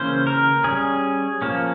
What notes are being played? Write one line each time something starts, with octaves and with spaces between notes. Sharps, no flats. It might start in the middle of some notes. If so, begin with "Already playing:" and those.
Already playing: C#3 E3 A#3 C#4 C5
A#4
G3 C#4 G#4
F3 A#3 C#4